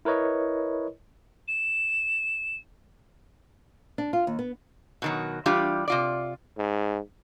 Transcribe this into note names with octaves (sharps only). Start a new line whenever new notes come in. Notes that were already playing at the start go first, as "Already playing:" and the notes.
E4 A#4 B4 C#5 D#5
E7
D4
F4
D#2
B3
B2 D#3 F#3
E3 G3 D4 F4 G4
C3 F4 D5
G#2